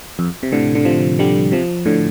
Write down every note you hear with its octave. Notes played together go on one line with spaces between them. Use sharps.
F2
C3
A2 D3
D3
C3 F3
D3 G3
C3 F3
A2 D3